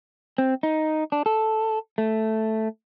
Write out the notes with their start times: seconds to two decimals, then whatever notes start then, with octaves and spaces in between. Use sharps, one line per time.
0.38 C4
0.63 D#4
1.12 D4
1.26 A4
1.98 A3